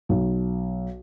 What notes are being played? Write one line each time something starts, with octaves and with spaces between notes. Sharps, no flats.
B1